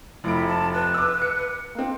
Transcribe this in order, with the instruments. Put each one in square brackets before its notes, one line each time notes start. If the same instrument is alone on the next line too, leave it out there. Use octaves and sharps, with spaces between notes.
[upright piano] F1 D7 [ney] E4
[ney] A5
B4
[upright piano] D6 E6
C#7
A#3 C4